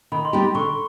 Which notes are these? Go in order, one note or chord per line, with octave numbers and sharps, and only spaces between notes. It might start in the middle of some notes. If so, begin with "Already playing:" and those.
D#3 B5
C6
G3 B3 D#4 G4 B5
D3 C#6